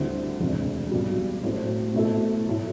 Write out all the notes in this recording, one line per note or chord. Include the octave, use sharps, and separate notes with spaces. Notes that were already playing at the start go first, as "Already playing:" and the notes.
Already playing: D2 D3 G3 C4 E4
E1 D2 C3
B1 B2 G3
A2 F#3 A3 C4
B2 A3 E4 A4
A2 F#3